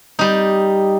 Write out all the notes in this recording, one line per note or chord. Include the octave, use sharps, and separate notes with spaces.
G3 D#4